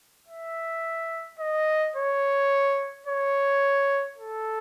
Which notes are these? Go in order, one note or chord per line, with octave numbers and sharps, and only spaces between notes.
E5
D#5
C#5
C#5
A4